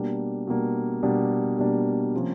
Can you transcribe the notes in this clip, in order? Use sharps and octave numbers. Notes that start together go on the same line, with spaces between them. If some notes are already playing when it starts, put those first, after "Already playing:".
Already playing: B2 G3 A#3 D4
B2 G3 A#3 D4
B2 G3 A#3 D4
B2 G3 A#3 D4
C3 F3 A#3 C#4